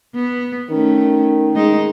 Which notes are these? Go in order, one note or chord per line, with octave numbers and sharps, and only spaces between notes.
B3
D#3 A3 C#4
G#3 D#4